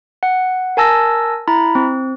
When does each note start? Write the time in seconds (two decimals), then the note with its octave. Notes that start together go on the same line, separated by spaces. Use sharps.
0.23 F#5
0.77 A#4 G#5 A5 E6 A#6
1.48 E4 A#5 B5
1.75 C4